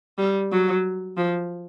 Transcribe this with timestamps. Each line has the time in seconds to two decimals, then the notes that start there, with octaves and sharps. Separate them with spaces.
0.18 G3
0.52 F#3
1.17 F3